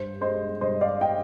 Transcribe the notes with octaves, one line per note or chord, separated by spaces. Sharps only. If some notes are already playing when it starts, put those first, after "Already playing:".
Already playing: G2 C5
G#3 C5 D#5
G2 C5 D#5
D5 F5
D#5 G5